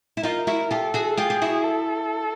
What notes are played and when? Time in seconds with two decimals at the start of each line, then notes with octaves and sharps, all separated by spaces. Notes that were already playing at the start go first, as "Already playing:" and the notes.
0.17 E4
0.23 D#4 F4 A#4
0.47 E4 F#4
0.70 F4 G4 A4
0.94 F#4 G#4
1.17 F4 G4 G#4
1.30 G4
1.42 E4 F#4
1.64 A4